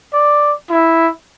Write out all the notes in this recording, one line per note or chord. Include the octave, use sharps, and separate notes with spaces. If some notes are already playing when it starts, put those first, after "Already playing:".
D5
E4